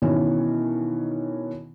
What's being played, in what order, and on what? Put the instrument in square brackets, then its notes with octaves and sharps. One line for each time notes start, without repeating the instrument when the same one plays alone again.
[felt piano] B2 D#3 E3 C#4